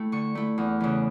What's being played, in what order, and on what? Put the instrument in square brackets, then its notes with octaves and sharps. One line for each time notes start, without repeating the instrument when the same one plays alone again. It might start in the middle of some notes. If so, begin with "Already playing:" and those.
Already playing: [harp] A3 E4 G5
D3 C#6
A3 E4
E2
C#3 E3